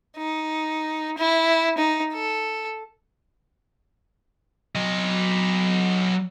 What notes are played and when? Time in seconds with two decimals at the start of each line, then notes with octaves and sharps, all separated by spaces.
0.18 D#4
1.18 E4
1.78 D#4
2.14 A4
4.75 F#3 D#5